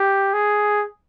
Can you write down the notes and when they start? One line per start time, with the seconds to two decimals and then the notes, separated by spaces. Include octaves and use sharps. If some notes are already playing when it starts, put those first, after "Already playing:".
Already playing: G4
0.34 G#4